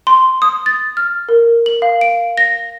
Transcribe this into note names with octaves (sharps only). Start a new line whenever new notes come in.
C6
D#6
A6
F6
A#4
F#7
F5
D7
A#6